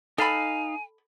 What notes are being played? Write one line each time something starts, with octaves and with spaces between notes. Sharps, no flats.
D#4 A4 F5 G#5 B5